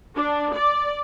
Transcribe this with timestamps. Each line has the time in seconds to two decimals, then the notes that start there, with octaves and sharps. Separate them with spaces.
0.16 D4
0.54 D5